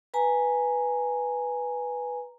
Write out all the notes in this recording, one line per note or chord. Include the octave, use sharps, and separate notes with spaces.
B4 G#5 A#5